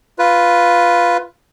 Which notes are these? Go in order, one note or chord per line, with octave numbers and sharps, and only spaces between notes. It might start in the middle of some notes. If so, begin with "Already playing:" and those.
F4 B4